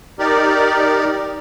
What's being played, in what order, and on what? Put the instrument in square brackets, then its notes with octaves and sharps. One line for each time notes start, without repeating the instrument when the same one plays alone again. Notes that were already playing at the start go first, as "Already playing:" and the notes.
[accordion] D#4 G4 A#4 D5